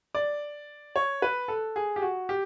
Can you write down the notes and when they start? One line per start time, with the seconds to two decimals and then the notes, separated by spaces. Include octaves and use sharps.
0.15 D5
0.96 C#5
1.22 B4
1.48 A4
1.76 G#4
1.96 G4
2.02 F#4
2.29 G4